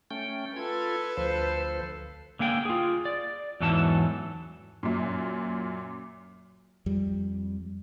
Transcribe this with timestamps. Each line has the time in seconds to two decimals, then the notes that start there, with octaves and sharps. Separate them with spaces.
0.11 A3 C#4 G5
0.56 F4 A4 B4 G#6
1.17 D2 F3 C5
2.39 D3 A#3 G#4 G5
2.65 F4 G#4
3.05 D5
3.60 E2 G#2 E3 F#3 A4 A5
4.83 F#2 A#2
6.86 F2 G3